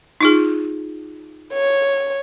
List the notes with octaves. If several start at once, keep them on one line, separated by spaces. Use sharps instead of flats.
D#4 F4 G#4
C#5